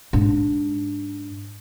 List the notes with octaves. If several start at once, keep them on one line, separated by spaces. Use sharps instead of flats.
G#2 D4